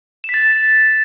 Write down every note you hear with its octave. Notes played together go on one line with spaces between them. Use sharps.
A6 B6 E7